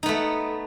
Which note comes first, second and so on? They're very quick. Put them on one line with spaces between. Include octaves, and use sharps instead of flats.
D#4 B3 A3